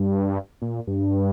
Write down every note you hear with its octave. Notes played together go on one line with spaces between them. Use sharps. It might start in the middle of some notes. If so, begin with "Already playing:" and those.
Already playing: G2
A#2
G2